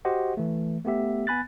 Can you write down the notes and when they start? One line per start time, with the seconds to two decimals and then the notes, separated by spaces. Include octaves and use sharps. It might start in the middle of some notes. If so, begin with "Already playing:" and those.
0.05 F#4 G4 C5 D#5 F#5
0.37 E3 A3
0.85 A3 B3 G4 E5
1.27 B3 G#5 B5 F#6 A6